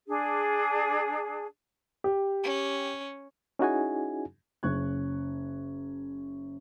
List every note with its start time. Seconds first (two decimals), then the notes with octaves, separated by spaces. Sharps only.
0.08 D4 G#4
2.04 G4
2.43 C#4
3.59 C#4 D#4 E4 F#4 G#4 G#5
4.63 F#1 C#4 C#6 F#6 G#6